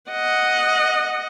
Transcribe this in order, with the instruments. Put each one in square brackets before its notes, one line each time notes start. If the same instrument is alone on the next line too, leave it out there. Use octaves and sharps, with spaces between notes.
[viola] D#5 F#5